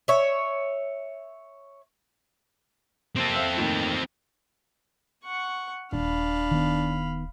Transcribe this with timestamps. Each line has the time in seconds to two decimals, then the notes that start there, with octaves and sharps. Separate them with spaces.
0.08 C#5 E5
3.16 C3 A#3 C4 A4 C5
3.34 C5 E5 F5
3.57 A2 D#3 A#3
5.24 F#5 C#6
5.93 D#1 D4 F5 B5
6.51 D#3 B3